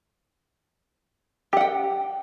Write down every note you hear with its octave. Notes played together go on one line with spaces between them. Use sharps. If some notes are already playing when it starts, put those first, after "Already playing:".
G4 F#5 G5